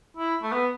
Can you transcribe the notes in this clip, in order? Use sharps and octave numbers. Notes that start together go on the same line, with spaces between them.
E4
A3
B3